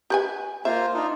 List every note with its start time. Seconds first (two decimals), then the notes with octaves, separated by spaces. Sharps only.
0.10 G4 B4 G#5
0.65 A#3 F4 C5 E5
0.94 D4 D#4 F4